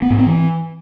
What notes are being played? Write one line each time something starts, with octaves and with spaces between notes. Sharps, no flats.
B3
G#2
C4
E3